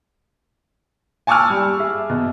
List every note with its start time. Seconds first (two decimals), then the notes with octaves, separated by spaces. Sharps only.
1.27 G#5 A5 C#6 D6 E6 F6
1.50 G3
1.77 G#4 E5
2.10 B2